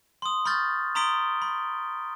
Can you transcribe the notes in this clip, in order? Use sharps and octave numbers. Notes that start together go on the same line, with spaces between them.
C6 D#6
B5 C#6 F6 G6 A6
A#5 C6 D#6 B6 D7 G7
B5